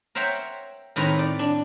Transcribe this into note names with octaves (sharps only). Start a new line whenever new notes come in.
A#4 C5 C#5 E5 F#5 G5
A2 D#3 C4 B4 C#5 A#5
D5
D4